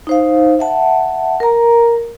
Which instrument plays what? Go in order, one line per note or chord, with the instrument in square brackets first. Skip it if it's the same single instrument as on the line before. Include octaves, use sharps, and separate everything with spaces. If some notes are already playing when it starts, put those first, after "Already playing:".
[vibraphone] D#4 C5 F5
E5 F#5 A5
A#4 A#5